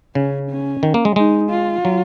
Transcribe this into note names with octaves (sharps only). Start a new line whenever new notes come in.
C#3 C#4
C#4
D#3
A#3
G#3
G#3 D#4
F4
F#3